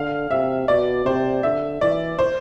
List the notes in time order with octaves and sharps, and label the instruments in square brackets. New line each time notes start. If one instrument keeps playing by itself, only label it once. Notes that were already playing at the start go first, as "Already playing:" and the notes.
Already playing: [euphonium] D3 [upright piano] F5
[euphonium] C3 [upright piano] E5
[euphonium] B2 [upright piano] D5
[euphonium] C3 [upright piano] C5
[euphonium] D3 [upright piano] E5
[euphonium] E3 [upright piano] D5
[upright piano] C5